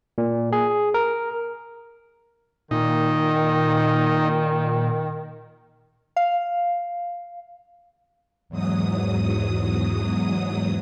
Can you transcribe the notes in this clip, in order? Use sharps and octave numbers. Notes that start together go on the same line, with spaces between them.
A#2
G#4
A#4
A#2 D#3 D#4
F5
E2 G#2 F#3 D#6